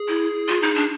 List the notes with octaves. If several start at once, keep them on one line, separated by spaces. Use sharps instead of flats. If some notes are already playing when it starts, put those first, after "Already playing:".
Already playing: G#4
E4
F4
D#4
D4